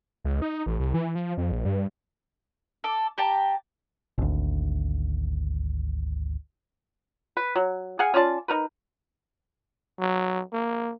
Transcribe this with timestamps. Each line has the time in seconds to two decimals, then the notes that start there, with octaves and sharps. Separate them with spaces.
0.24 C#2
0.42 D#4
0.66 A1
0.79 C2
0.94 E3
1.15 F3
1.37 F2
1.52 A#1
1.65 G2
2.84 A4 D6
3.18 G4 G5 A5 A#5
4.18 G#1 D2
7.37 B4
7.56 F#3
7.99 G#4 F5 F#5 G#5
8.14 C#4 F4 D5 A5
8.48 D#4 A#4 B4
9.99 F#3
10.53 A#3